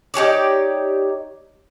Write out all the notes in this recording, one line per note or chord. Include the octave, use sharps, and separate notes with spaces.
D#4 G4 C#5 D5